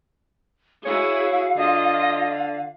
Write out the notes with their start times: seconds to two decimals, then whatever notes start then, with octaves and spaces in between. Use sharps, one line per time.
0.85 E4 F#4 G#4 C#5 F5
1.57 D3 F4 D#5